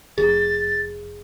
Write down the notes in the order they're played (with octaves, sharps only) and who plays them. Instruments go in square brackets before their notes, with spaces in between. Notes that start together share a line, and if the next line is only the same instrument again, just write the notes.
[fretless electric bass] F1 [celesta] G#4 [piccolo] A6